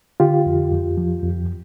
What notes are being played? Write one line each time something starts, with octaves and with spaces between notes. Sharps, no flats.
D3 F4 G4
F2
F2
F3
F2